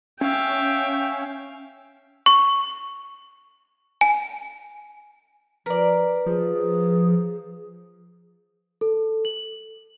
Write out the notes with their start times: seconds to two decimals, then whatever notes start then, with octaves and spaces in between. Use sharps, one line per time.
0.21 C#4 E5 F5 G5
2.26 C#6
4.01 G#5
5.66 F3 A#4 B4 D5
6.26 F3 G#4
8.81 A4
9.25 F#7